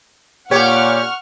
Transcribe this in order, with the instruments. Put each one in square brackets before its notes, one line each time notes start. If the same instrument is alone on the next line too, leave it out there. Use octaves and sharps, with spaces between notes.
[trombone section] A#2 [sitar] G4 C#5 [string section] F#5 C#6 F6